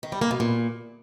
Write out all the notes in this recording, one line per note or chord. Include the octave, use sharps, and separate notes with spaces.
D#3
G3
A#3
B2
A#2